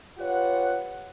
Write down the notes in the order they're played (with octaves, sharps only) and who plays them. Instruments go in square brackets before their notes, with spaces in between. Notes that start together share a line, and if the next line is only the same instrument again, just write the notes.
[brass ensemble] F4 G4 B4 C#5 F#5